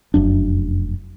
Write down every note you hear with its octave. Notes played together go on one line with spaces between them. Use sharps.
F1 F#2 D4